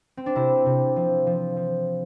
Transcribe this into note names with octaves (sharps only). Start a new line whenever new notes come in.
C4
D4
C3 E4
C3
F3
F3
F3